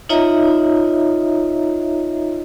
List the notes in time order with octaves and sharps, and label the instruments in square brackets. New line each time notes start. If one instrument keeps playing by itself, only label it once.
[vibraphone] D#4 F4 C#5 D#5 E5 A#5